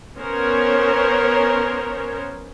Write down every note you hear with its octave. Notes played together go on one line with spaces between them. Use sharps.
B3 C#4 A#4 C5 C#5